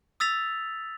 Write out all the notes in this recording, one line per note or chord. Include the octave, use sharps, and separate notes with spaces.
D#6 E6 A6 B6 F7